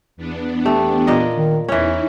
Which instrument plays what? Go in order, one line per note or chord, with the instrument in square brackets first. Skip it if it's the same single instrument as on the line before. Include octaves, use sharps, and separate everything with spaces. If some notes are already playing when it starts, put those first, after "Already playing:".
[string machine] E2 B3 D4
[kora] A3 [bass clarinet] G4
[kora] A#2 A#4 D#5
[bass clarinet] D#3
[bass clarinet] E2 [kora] E3 C#4 [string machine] D#4 E4